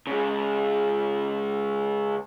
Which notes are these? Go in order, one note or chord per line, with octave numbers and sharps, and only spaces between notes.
C#3 G#3